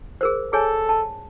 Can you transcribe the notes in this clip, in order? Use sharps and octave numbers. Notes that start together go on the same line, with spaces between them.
G#4 A#4 C5
G#4 A4 C#5 G#5
A5